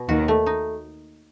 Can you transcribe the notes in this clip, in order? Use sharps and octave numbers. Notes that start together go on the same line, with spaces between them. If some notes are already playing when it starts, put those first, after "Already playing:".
Already playing: B2
D#2 D#3 F#4
A3
D#4